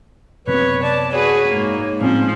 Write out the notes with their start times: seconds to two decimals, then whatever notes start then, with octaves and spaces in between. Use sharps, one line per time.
0.47 F#2 C3 B3 B4 C#5
0.83 D5 A5
1.12 F#4 G#4 B4 C#5
1.50 G#2 A#3
2.01 A2 F3 A#3 C4 C#4